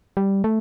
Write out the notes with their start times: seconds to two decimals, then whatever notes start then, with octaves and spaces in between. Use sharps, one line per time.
0.17 G3
0.44 A3